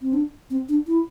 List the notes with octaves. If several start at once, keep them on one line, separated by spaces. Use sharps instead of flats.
C4
D4
C4
D4
E4